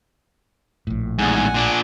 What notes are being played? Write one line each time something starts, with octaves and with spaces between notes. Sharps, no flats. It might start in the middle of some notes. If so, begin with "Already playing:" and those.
A#1 A2
E2 G#2 F#5 G#5
A#2 D4